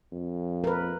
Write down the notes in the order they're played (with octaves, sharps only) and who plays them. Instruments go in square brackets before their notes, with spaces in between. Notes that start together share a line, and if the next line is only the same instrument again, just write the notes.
[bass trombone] F2
[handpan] A#4 B4